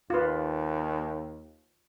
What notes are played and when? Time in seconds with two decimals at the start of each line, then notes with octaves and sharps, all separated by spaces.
0.10 D#2 F4 B4